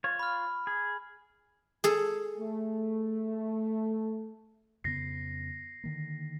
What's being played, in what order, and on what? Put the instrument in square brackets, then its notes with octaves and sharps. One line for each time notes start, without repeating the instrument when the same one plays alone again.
[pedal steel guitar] F4 C#5
[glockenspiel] B5 F6
[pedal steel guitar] G#4
[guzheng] G#4 A4
[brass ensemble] A3
[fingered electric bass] F2 C#3 B3 [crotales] A#6 C7
[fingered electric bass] D3 D#3 A#3